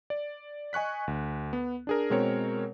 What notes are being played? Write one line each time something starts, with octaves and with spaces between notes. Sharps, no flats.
D5
D#5 G#5 C#6 F#6 B6
D2
B3
D4 G#4 A#4
B2 G#3 C4 A#4 C#5